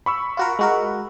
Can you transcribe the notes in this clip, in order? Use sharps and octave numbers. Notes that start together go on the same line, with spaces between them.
B5 C#6 E6
F4 F#4 A#4
G#3 F#4 A#4